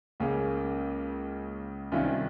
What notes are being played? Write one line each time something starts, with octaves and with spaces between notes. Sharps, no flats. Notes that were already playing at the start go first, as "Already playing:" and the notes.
C#2 C#3 A#3 C#4
C2 C3 D#3 C#4 F4